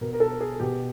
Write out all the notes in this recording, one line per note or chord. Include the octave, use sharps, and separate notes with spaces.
B2 A#4
A#4
A4
G#4
B2 G4